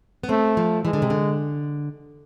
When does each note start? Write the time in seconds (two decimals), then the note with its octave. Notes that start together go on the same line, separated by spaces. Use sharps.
0.23 B3
0.29 A3 C4
0.57 F3
0.84 E3 G#3
0.93 D3
1.02 C3
1.10 D3